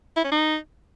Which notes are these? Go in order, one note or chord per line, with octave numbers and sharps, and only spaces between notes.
E4
C#4
D#4